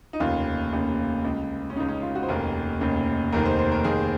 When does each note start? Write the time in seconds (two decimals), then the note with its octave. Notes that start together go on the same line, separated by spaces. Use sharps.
0.13 D#4
0.20 F1 D#2 C#3 F4
0.72 F1 D#2 C#3
1.25 C#2 C#3
1.70 C#4
1.76 C#2 C#3 D#4
1.89 C#4
2.02 F4
2.15 F#4
2.23 C5
2.28 F1 D#2 C#3 A#4
2.80 F1 D#2 C#3
3.32 F1 D#2 D#3 A#4
3.45 C5
3.59 C5
3.71 A#4
3.84 F1 D#2 D#3 G#4